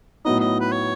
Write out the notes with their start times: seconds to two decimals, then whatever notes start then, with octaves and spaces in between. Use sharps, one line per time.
0.25 A2 F#3 B3 D#4 D#5
0.40 D#5
0.60 B4
0.72 C#5